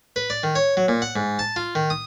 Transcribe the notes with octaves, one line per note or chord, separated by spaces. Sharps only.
B4
D5
D#3
C#5
F#3
A#2
F#5
G#2
A5
F4
D#3
D#6